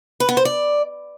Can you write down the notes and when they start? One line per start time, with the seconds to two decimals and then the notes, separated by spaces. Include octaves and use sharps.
0.20 B4
0.29 B3
0.37 C5
0.45 D5